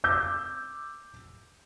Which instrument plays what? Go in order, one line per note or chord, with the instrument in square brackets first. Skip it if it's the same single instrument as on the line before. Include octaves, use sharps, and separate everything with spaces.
[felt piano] D6 E6 G6